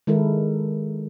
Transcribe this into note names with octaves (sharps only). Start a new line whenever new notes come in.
D#3 G#3 E4 A4 A#4